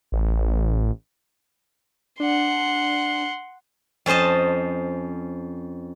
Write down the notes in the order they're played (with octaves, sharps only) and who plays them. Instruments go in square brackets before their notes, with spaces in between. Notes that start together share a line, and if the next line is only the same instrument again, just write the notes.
[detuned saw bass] A1
[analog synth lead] D4 [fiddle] F#5 C6
[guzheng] F2 C#4 C5 D#5 A5